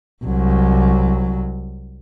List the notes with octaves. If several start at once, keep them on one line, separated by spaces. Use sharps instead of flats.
C2 F#3